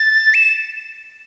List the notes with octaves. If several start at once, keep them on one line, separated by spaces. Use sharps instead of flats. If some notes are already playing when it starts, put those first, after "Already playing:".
Already playing: A6
E7